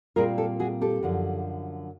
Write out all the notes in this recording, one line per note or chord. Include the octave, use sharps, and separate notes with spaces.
A#2 G3 C4 F4 G#4 A#4
G4 A4
F#4 G#4
G4 A4
F#2 D3 F3